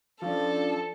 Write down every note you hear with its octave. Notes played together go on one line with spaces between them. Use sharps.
F3 C#4 D4 A4 D5